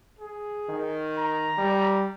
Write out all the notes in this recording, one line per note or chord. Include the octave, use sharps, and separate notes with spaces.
G#4
D#3
A#5
G3